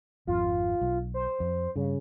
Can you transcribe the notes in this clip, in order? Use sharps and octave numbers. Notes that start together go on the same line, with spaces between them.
G#1 F2 F4
B1
C5
F2
G2 C#3